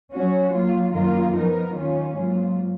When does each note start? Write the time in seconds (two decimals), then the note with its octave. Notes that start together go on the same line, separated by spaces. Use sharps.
0.13 F#3 C#4 F#4 C#5
0.54 F#3 A#3 F4
0.94 F#2 D#3 A#3 F4 A#4
1.35 F3 B3 D#4 A#4
1.76 D#2 D#3 A#3 C#4 F4
2.17 G#2 F#3 A#3 F4